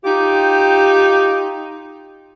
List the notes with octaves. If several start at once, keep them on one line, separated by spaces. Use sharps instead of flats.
D#4 F4 G4